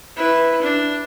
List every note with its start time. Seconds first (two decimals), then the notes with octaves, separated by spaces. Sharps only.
0.16 E4 B4
0.61 D4